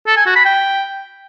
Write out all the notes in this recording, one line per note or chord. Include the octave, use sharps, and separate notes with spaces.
A4
G#5
F#4
B5
G5